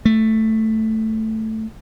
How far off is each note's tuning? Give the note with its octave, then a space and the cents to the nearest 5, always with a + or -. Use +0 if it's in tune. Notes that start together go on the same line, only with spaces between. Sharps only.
A3 +5